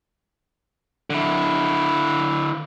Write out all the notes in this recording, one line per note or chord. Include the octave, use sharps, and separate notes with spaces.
D3 E4